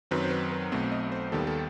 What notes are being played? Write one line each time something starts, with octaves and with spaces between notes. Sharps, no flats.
F#2 D#3 F#3 C4 B4
C5
B4
B4
B1 B2 A3 C4 C5
D#5
C5
D#2 D#3 G3 B3 A4
A4